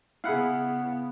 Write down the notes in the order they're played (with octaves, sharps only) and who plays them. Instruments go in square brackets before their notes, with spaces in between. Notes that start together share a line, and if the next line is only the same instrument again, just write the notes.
[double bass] C#3 B3 [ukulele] E4 G#4 [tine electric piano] F5 F#5 B5